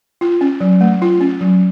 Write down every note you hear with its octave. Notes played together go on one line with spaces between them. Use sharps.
F4
C#4
F#3
A3
F4
C#4
F#3